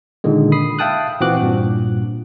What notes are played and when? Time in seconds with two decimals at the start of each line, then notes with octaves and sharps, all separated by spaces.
0.24 A#2 D3 D#3 G#3
0.52 B5 D#6 C7
0.79 E5 F5 G5 A5 D#6 F#6
1.20 A#2 E3 C4 F#4 D6 F#6
1.42 G2 A#2